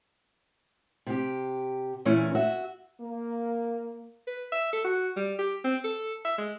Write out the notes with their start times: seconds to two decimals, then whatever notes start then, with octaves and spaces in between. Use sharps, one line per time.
1.07 C3 G4
2.05 A#2 E3 A3 C#4
2.35 F#4 E5
3.01 A#3
4.27 B4
4.52 E5
4.73 A4
4.85 F#4
5.17 G3
5.39 G4
5.64 C4
5.84 A4
6.25 E5
6.38 G#3